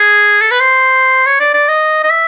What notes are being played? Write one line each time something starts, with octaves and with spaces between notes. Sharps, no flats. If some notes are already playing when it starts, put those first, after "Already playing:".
Already playing: G#4
A4
B4
C5
C#5
D5
D5
D#5
D#5
E5